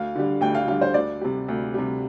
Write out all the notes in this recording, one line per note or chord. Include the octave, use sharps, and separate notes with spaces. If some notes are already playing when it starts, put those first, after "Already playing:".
Already playing: D2 F5
D3 G3
D2 G5
F5
D3 G3 F5
C5
D2 D5
C3 G3
D2
C3 G3